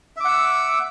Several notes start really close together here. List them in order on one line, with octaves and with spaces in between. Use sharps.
E5 D6 F#5 E6